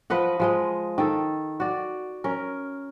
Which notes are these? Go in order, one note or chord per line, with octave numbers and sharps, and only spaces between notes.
F3 B4 D#5 F#5
F3 G#3 D#5
D#3 A4
F#4 D5
C#4 A#4